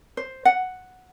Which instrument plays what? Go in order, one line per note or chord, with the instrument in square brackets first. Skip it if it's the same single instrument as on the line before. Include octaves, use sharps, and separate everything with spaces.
[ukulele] C5
F#5